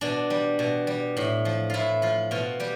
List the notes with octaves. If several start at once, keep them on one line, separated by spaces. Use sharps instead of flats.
B2 D4
G3
B2
G3
A2
F3
A2 E4 F4
F3 F4
B2 F4
G3 G4